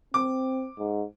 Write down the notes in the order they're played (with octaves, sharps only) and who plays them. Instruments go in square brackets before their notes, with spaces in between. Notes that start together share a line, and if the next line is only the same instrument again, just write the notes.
[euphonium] C4 [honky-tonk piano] D6
[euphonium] G#2